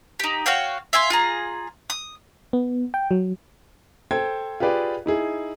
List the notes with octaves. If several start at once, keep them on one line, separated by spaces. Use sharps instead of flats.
D#4 G4
F#4 C#5 F5 G5
E5 F5 G#5 C6
F4 G#4 A#5
D#6
B3
G5
F#3
A4 C5 G5 G#6
F4 G4 G#4 B4 D5 F5
D#4 E4 G#4